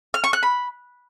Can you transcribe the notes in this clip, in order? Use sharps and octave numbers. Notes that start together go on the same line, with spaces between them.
F6
C#6
F#6
B5